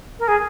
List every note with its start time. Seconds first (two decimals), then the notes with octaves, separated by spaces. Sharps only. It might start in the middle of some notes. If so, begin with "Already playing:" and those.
0.19 A#4
0.28 G#4